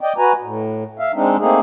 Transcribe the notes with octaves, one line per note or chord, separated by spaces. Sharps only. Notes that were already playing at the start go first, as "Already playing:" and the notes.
D5 D#5 G5
F#4 B4 G#5 A#5
A2
E5 F5
G#3 C4 D4 D#4
A3 A#3 C4 D#4 G#4